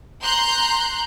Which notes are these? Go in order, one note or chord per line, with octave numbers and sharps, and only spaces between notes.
A#5 C6 F#6 G6